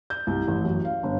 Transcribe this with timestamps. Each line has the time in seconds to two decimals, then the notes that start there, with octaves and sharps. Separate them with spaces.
0.10 G6
0.27 C2
0.47 A1
0.65 F#2
0.85 F5
1.03 G1